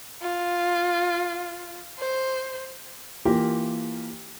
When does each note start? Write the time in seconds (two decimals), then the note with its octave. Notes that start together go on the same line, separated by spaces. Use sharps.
0.22 F4
1.99 C5
3.25 E3 A#3 F4 G4